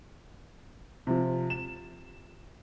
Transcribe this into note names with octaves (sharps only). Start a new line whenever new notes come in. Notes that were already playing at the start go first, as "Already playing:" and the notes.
C3 F3
E7